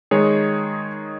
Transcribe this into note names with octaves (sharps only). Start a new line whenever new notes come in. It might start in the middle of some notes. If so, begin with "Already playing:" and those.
D#3 G#3 D#4 G#4 C#5